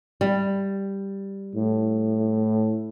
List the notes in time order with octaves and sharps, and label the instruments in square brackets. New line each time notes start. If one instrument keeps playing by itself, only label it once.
[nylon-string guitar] G3
[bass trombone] A2